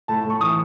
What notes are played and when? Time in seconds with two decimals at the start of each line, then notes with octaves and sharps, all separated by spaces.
0.08 A2 A5
0.24 A2
0.30 C#6
0.41 E3 D#6